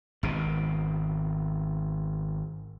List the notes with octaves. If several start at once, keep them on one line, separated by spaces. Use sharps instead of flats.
G#1 B2